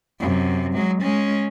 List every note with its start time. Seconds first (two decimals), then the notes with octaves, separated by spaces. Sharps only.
0.20 F#2 C3
0.73 F#3 G#3
1.02 G#3 C#4